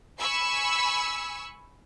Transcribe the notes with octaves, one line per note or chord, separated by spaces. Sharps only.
G#5 B5 C#6 E6